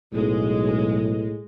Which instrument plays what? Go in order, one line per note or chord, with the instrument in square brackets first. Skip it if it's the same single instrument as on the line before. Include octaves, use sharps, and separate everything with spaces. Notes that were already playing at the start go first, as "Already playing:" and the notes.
[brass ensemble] B1 [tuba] A2 [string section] G#3